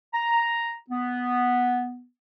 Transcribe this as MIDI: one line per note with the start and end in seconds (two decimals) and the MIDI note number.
0.14 0.72 82
0.91 2.04 59